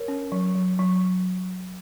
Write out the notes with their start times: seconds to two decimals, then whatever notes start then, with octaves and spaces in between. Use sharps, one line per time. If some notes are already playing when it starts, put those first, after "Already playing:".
Already playing: A#4 C#5
0.08 C#4
0.32 F#3
0.55 F#3
0.79 F#3